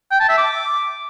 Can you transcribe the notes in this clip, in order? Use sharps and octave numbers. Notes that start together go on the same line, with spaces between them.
G5
A5
E5
D6